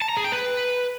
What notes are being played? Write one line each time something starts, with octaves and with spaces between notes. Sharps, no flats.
A5
A#5
G#4
G5
B4